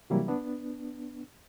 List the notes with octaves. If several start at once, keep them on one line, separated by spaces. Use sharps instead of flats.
C3 E3 F#3 G3 A#3 E4
B3 D4